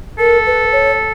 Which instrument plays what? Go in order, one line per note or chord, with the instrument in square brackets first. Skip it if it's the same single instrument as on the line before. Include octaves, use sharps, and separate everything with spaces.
[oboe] A4 [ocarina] A#4
[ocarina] B4
C#5